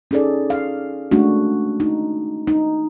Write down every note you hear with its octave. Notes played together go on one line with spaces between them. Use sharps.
C#4 D#4 G#4 A4 D5
F5
G#3 A3 C#4 D4 F#4
D#4
D#4